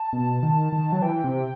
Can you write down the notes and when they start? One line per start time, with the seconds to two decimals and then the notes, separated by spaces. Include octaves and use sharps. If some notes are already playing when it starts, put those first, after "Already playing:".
Already playing: A5
0.13 B2
0.43 D#3
0.72 D#3
0.92 F#3
1.02 E3 G5
1.24 C3